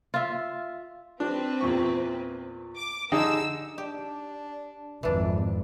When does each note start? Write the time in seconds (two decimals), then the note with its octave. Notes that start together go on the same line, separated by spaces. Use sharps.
0.14 F4 E5
1.20 C4 D4 B4
1.61 E2 A#2 C#6
2.77 D6
3.12 D3 D#4 G#4 E6
3.78 D4 G4
5.03 G#1 F2 E3 D4